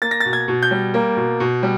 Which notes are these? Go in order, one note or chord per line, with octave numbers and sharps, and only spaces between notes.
A#3 A6
A#6
A6
B2
G#6
B2
G6
G3
A#3
B2
B2
G3